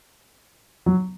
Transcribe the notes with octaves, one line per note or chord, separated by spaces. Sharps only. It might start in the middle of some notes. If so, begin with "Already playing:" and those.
F#3